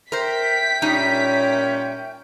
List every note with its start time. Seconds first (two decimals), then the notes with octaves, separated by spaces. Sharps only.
0.12 A#4 C5 E5 G5 G6 B6
0.82 A#2 G3 C#4 D#4